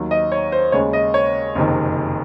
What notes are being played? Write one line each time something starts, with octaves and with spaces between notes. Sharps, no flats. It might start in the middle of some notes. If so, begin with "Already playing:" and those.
Already playing: D#2 D#3 F#3
D#5
C#5
C5
D#2 C#3 G#3 C#5
D#5
C#5
F#1 F2 C3 D#3